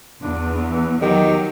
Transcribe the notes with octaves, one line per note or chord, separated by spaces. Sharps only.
E2 D4
E3
D#3 F#3 G4